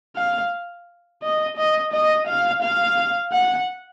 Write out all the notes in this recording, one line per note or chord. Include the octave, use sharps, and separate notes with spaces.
F5
D#5
D#5
D#5
F5
F5
F#5